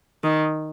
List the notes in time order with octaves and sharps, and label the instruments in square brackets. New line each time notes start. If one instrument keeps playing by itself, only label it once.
[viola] D#3